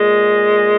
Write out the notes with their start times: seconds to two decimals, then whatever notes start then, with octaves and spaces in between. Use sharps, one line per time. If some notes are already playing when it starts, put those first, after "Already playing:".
Already playing: A#2 G#3